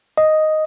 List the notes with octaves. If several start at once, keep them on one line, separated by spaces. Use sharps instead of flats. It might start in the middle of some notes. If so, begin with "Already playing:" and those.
D#5